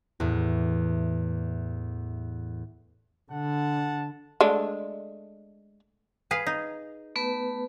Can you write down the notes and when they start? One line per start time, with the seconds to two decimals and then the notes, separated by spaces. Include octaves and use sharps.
0.20 E2 A2
3.32 D3 F#5 A5
4.41 G#3 A3 D4
6.31 G#4 B4 F5
6.46 D#4
7.16 A3 B3 B4